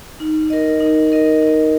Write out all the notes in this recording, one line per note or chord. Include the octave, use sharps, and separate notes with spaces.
D#4
A#4 D#5
D#4
A#4 D#5
D#4